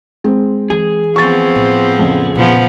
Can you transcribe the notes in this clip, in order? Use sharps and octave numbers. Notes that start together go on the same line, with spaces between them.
G#3 C4
E3 G#4
F3 B3 C4 C#6 A6
A2
F2 C#3
A#2 F3 B3